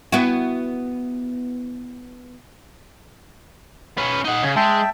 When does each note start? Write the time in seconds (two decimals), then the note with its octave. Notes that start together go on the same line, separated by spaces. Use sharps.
0.12 B3 E4 F#4
3.98 C#4 B4
4.24 D#4 F#5
4.42 C#3 C#5
4.56 G#3 E5 G5 A5